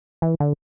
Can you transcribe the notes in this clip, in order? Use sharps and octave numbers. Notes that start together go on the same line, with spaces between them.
E3
D3